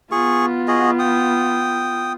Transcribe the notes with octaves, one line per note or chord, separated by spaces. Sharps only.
B3 F4 G#4 C#6
F#4 G#4 D#5
G5 D#6